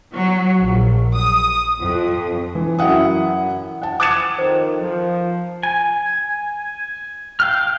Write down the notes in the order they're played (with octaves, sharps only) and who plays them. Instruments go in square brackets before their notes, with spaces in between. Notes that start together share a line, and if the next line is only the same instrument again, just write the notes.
[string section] F#3
A#1
D#6
F2
[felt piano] E3
F#2 E4 E5 F#5 D#6
F#5 A5
D6 F#6 G#6 A6 C#7 E7
[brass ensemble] F2 D#3 [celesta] C5
[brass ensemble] F3
[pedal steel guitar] G#5
F5 G5 F6